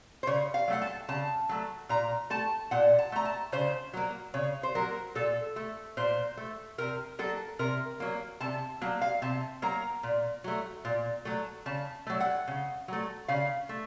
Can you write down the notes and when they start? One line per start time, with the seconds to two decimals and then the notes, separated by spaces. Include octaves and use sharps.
0.23 C5
0.27 C#3 C#5
0.54 F5
0.68 F#3 A3 F#5
0.82 A5
1.08 C#3 A5
1.49 F#3 A3
1.89 A#2 A#5
2.30 A3 A5
2.71 A#2 F#5
2.99 A5
3.12 A3 A#5
3.25 A5
3.52 C#3 C5
3.93 F#3 A#3
4.34 C#3 C#5
4.63 C5
4.75 F#3 A#3 A#4
5.15 A#2 A4
5.56 A3
5.97 A#2 C5
6.37 A3
6.78 C3 A#4
7.19 F#3 A#3 A4
7.59 C3 A#4
8.00 F#3 A#3
8.41 C3 A5
8.81 F#3 A#3
9.01 F5
9.22 C3 A5
9.62 F#3 A#3 A#5
10.03 A#2
10.44 F#3 A3
10.85 A#2
11.25 F#3 A3
11.66 C#3 A5
12.07 F#3 A3
12.20 F#5
12.47 C#3
12.88 F#3 A3
13.28 C#3 F5
13.69 A3